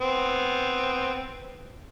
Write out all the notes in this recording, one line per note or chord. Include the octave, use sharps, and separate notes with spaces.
B3 C4